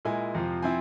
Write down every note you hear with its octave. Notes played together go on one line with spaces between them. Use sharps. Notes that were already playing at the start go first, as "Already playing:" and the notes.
A#2 G#3 E4 G#5
F2 C3 F3
F3 C4 E4 G#5